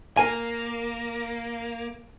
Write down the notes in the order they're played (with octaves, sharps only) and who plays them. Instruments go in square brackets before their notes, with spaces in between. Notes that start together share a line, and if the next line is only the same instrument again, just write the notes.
[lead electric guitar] A#3 [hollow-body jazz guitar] A#4 G#5